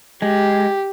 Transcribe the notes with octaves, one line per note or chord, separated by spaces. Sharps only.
G#3 G4